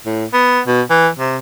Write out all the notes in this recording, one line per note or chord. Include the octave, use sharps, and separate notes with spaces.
A2
B3
B2
E3
C3